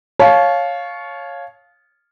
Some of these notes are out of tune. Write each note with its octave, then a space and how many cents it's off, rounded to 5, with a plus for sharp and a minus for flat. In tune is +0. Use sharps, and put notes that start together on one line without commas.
C#5 +0 F5 +5 A5 -30